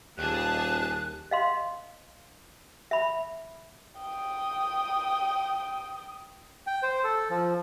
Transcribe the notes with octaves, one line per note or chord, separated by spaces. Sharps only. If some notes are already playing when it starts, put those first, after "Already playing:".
D#1 D#2 G4 G#4 A5 F#6
D#5 F5 C6
E5 B5
G5 D#6
G5
C5
A4
F3